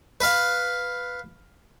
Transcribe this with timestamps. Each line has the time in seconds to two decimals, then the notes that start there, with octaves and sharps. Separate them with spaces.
0.21 B4 F5